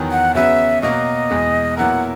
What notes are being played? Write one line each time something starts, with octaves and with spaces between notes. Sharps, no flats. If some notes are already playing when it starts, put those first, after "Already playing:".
Already playing: E2 D#3 F#3 B3 D#4
F#5
C#3 F#3 B3 F#4 B4 E5
B2 F#3 A#3 D#5
E2 B2 G#3
A#2 F#3 B3 E4 A#4 F#5